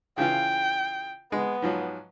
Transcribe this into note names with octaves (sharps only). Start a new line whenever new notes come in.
C#3 E3 F4 G5
G#3 B3
G#2 F3 F#3